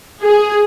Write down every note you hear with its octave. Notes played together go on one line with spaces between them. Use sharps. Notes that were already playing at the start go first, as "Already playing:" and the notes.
G#4